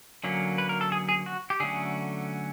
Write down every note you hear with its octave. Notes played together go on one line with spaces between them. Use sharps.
D3 F#3 A#3 C#4
B4
A#4
A4
G#4
G#4
F#4
G4
D3 F#3 A3 C#4 G#4